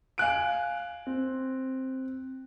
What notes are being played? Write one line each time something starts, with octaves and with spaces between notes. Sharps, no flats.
F5 G#5 F#6 D7
C4